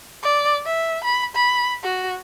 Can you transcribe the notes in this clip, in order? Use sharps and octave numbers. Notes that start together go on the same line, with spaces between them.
D5
E5
B5
B5
F#4